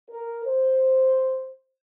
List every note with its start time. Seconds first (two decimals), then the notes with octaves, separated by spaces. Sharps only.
0.10 A#4
0.45 C5